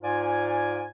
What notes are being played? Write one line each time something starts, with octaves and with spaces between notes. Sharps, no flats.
G#2 F4 D5 G#5